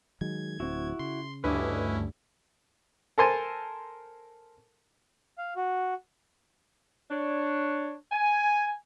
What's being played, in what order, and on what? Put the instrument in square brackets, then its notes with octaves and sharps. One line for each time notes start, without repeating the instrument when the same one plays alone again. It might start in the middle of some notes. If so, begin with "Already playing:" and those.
[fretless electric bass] D#3 F#3 G#3 [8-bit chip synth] G#6
[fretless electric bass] D1 D2 C4 [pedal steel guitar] E4 F#4
[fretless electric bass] C#3 [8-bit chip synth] C6
[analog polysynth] D2 G2 [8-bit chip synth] C#4 E4 [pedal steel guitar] B4 D#5 D6
[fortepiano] A4 A#4 C5 G#5 A5
[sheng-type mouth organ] F5
F#4
[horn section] D4 C#5
G#5